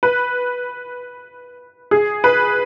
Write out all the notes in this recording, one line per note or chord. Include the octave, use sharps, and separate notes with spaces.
B4
G#4
B4